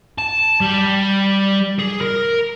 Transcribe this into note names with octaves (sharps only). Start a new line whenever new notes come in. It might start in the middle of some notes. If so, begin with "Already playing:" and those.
A5
G3
G#4
A#4